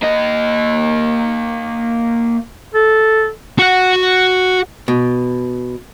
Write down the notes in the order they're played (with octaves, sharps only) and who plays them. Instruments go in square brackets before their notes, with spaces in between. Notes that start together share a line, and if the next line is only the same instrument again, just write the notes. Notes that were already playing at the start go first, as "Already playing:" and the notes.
[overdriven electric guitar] A#3 D#5
[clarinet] A4
[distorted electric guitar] F#4 F#5
[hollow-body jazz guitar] B2